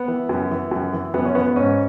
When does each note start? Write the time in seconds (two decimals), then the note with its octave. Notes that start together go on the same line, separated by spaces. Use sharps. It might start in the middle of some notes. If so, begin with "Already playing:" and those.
Already playing: B3
0.08 E3
0.29 F#2
0.51 E3
0.71 F#2
0.93 E3
1.14 F#2 B3
1.25 C#4
1.35 E3 B3
1.46 B3
1.56 G#2 C#4